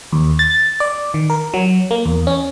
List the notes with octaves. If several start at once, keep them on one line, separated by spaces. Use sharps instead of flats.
D#2
A6
D5
D#3
A#4
F#3
A#3
E2
C#4